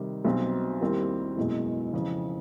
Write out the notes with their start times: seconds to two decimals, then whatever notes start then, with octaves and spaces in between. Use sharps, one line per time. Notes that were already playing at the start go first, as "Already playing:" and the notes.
Already playing: C3 D#3 G3
0.25 B1 B2 G3 C4
0.81 D#2 D#3 G3 C4 E4
1.37 F#1 E2 B2 G#3
1.93 F2 C#3 E3